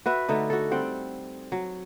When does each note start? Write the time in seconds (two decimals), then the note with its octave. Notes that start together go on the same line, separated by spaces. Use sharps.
0.06 F#4 B4 E5
0.29 D3 A3 D#4
0.50 F#4 A4
0.71 G3 C4 F#5 G5
1.52 F#3